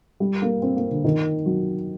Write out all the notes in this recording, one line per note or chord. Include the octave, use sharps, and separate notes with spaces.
G3
A#3
C4
A#3
D3
D#3
F#3